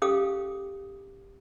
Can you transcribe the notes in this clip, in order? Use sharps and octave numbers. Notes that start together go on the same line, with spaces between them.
C#4 G4 A4 F5 D6 D#6